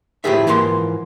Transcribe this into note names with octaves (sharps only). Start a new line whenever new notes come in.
A2 F3 E4 G4 G#4 E5
G#2 E3 F3 A#3 A#5 C6